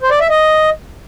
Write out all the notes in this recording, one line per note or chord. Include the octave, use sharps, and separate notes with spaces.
C5
D5
E5
D#5